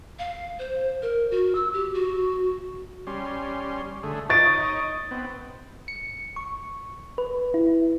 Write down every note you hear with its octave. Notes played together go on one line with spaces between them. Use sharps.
F5
C5
A#4
F#4
E6
G4
F#4
G3 C#4 C6
D3 A3 G#4
D#4 C#5 D#5 C#6 A6 D7
B3 C4
C#7
C#6
B4
E4